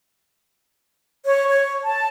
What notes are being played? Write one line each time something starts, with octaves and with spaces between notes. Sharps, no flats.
C#5
C#5
A5